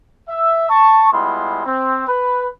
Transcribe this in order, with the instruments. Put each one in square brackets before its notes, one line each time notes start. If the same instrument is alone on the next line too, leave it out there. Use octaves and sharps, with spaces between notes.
[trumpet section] E5
A5 C#6
G3 G#3 B3 E4 F4 C6
C4
B4